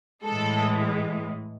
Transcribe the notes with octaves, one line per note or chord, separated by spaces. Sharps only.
A2 E3 G#3 A4